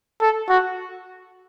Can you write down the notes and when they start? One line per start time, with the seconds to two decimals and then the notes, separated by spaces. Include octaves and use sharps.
0.21 A4
0.49 F#4